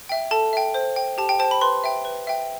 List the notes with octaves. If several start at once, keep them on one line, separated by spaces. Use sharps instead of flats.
E5 G5
A4 A5
E5 G5
C5
G5
G4 A5
G5
C5 A5
G5
B5
B4 C6
E5 G5
B4
E5 G5